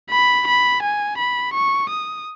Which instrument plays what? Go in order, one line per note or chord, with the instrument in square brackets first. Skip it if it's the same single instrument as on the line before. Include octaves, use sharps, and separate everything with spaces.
[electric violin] B5
B5
G#5
B5
C#6
D#6